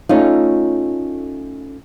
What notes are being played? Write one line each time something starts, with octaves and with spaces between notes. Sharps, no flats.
A3 C#4 D#4 F4